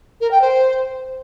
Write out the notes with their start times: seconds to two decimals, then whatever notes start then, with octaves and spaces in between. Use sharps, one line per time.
0.21 A#4
0.31 G5
0.42 C5